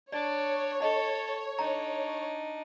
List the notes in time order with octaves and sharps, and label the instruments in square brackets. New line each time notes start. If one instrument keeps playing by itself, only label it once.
[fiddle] D4 [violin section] C#5 [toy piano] D5
[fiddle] A4 [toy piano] D#5
[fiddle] D4 D#4 [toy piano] A#5